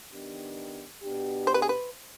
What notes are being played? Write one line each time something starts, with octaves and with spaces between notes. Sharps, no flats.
D#3 B3 D4 G4
B2 B3 D4 G4
C5
B4
G#4
B4